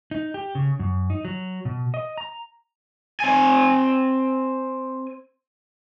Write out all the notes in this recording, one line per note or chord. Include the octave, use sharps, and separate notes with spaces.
D#4
G4
C#3
F#2
D#4
F#3
B2
D#5
A#5
C4 G#5